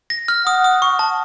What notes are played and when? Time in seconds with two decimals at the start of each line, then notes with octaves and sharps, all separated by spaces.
0.10 A#6
0.28 F6
0.46 F#5 D#6
0.64 D#6
0.82 C#6
0.99 A5